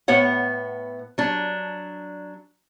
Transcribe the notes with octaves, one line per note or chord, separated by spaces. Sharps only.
A2 B3 C#5 F#5
F#3 D4